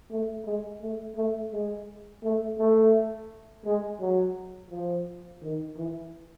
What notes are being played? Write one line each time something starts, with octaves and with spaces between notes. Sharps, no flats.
A3
G#3
A3
A3
G#3
A3
A3
G#3
F#3
F3
D#3
E3